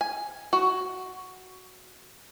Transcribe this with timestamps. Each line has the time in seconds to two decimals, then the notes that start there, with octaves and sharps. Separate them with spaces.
0.01 G#5
0.53 F#4